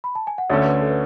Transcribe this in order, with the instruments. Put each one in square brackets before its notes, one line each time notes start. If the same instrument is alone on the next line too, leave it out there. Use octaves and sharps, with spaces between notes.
[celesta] B5
A5
G#5
F#5
[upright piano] D2 D3 A3 C#4 [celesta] C#5 E5
[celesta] B4
A4
B4